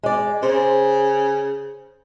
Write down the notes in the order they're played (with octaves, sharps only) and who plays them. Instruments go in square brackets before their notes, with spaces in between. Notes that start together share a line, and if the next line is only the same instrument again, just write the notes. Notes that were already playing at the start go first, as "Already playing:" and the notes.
[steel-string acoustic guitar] G#3 D5
[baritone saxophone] C#3 [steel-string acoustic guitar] C5